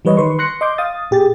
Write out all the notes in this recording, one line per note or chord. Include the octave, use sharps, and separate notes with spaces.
E3 G3 B4 C#5 D#5
D#3 B4 C6 C#6
C6 F#6 A#6 C#7
D#5 C6 D6 G6
F5 D#6 A6
A#2 G4 G#4 A6